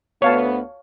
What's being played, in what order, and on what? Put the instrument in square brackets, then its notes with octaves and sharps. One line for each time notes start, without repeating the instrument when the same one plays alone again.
[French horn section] D2 B3 [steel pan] C#5 F5 A5